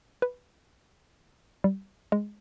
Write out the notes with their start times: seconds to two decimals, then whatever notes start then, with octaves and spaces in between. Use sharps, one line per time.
0.22 B4
1.64 G3
2.12 G#3